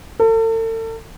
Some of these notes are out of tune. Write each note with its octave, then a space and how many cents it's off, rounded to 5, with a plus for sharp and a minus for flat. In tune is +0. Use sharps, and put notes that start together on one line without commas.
A4 +40